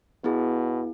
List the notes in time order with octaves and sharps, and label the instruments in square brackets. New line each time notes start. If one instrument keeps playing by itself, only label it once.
[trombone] B2 [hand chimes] B3 E4 G#4